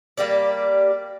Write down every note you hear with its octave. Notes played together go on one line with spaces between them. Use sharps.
G3 A#3 G4 D5